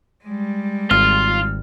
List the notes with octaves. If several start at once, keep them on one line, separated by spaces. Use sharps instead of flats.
G3 G#3
G#1 F4 F6